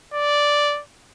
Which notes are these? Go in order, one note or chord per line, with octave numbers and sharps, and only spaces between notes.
D5